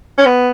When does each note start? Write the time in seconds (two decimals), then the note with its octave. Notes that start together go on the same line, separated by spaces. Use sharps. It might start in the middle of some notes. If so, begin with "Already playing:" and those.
0.18 C#4
0.26 B3